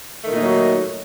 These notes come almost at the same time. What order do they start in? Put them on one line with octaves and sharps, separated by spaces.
A3 D#3 A#2 D#4 F#3